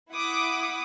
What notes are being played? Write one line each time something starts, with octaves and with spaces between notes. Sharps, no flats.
E4 F#5 D6 D#6